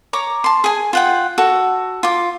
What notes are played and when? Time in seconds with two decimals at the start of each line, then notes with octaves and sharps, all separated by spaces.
0.13 C#5 A#5 D6
0.44 A5 C6
0.64 G#4 G#5
0.93 F4 F#5 G5
1.38 F#4 A4
2.03 F4 D6